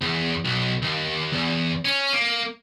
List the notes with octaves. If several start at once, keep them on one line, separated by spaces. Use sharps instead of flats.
E2
B1
D#2
E2
C#4
A#3